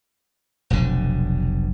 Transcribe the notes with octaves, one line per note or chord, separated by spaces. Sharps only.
F1 B1 B2 D3